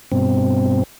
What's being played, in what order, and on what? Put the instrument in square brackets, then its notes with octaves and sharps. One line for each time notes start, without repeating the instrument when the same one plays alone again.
[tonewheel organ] G2 B2 C4